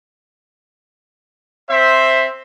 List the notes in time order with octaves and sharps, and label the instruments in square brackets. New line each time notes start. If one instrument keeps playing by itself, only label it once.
[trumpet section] C4 C5 E5